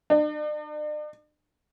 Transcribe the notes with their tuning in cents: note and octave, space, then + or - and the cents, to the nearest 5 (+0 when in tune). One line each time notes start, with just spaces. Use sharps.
D4 +45